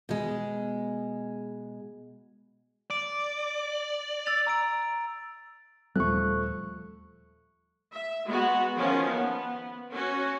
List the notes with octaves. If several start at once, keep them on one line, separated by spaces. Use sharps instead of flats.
B2 G#3
D5
E6 A6 F7
A#5 E6 D7
D#1 F3 G3 A3 C#6 F#6
E5
G#3 B3 F#4
D#3 F3 C#4
B3
C#4 F#4